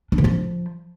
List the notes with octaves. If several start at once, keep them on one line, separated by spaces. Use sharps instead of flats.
D4
D#3
F3